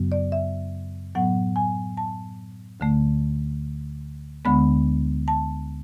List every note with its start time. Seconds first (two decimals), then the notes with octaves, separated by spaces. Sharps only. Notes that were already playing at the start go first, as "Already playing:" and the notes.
Already playing: F#2 C#3 F#3 B3
0.12 D5
0.32 E5
1.15 A2 F#3 B3 F#5
1.56 G#5
1.97 A5
2.80 D2 D3 A3
4.45 D2 D3 G#3 B3 B5
5.28 A5